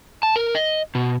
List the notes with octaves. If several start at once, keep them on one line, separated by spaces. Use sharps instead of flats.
A5
A#4
D#5
B2